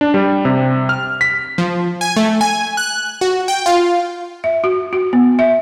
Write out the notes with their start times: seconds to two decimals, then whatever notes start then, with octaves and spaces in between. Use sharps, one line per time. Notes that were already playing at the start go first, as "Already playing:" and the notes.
0.01 D4
0.14 G3
0.45 C3
0.89 F6
1.21 B6
1.58 F3
2.01 G#5
2.16 A3
2.41 G#5
2.77 F#6
3.21 F#4
3.48 G5
3.66 F4
4.44 E5
4.64 F#4
4.93 F#4
5.13 B3
5.39 E5